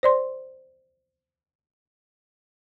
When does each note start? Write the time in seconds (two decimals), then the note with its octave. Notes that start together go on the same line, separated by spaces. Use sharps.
0.03 C5 D5 C6